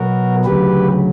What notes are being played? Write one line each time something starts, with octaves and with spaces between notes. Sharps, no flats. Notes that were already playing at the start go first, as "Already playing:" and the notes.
Already playing: B2 F#3 B3 F#4 A#4
D2 C#3 F#3 G4 B4